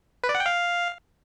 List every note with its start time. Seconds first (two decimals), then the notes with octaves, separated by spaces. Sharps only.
0.24 B4
0.29 D5
0.35 F#5
0.40 G5
0.46 F5